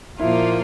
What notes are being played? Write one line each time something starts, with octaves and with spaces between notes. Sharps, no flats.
A#2 F3 A#3 E4 F4